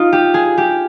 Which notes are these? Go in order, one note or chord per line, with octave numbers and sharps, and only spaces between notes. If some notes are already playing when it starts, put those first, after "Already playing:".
Already playing: D#4 F4
G4
G#4
G4